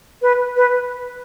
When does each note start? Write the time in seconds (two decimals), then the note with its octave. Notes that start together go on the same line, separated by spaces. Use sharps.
0.22 B4
0.56 B4